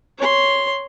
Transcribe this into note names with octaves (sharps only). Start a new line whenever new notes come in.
C#5 C6